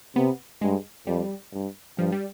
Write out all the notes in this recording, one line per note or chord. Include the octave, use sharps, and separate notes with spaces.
C3 B3
G2 G#3
F2 G3
G2
G2 F3
G3